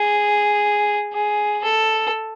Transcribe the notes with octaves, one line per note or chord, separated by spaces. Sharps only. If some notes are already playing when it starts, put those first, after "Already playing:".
Already playing: G#4
G#4
A4